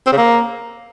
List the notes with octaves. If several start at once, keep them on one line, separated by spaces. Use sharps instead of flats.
C4
C#3
A#3